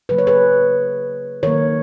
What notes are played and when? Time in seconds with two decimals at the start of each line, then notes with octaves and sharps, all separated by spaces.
0.09 C#3 F#3 A#3 B4
0.18 C#5
0.27 G#4 B4
1.43 D#3 F#3 A#3 A#4 C#5